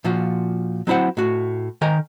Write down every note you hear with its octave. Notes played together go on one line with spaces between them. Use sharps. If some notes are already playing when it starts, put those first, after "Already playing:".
A#2 F3 F4 F#4
F#3 C4 E4 C5 F#5
A2 F#4
D#3 A#4 G#5 A#5